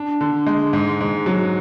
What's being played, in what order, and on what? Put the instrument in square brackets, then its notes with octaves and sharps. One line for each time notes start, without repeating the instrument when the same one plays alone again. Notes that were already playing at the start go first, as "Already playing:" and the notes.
Already playing: [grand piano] D4
D3
G#3
G#2
G#2
F#3